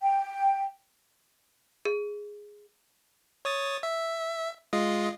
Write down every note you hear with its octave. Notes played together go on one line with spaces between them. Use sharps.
G5
G#4
C#5 D#6 A6
E5
G#3 F4 D#5